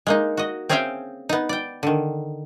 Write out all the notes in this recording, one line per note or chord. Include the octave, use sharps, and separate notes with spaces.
G#3 A#3 D#4
F#4 D#5
C4 C#4 G#4 E5 F5 G5
B3 D#4
D5 G5
D3 D#3